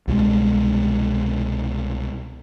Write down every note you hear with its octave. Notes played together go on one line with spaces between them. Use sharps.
C2 B2 G#3